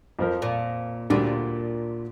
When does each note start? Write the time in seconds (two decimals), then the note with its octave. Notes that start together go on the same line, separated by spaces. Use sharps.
0.19 F2 F3 C4 A#4
0.42 A#2
1.10 D2 A#2 D3 G3 D4